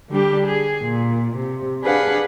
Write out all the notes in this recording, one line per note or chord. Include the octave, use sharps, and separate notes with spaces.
D3 G3 D4 G4
G#4
A#2
C3
D4 G#4 B4 F5 F#5